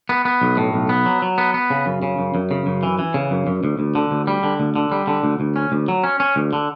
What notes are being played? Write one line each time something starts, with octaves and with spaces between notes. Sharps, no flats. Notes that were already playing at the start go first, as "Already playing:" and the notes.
B3
B3
B1
A2
B1
B3
F#3
F#3
B3
B3
C#3
F#2
C#3
F#2
F#2
C#3
F#2
E3
E3
C#3
F#2
F#2
D2
D2
D3
D2
G3
D3
D2
D3
G3
D3
D2
D2
C#4
D2
F#3
C#4
C#4
D2
D3